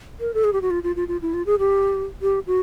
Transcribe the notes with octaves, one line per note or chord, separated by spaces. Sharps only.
A#4
A4
G#4
G4
F#4
F4
F4
F4
F4
E4
F4
G#4
G4
G4
F#4